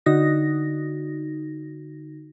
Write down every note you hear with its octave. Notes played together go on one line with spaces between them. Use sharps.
D3 D#4 F#4 A#6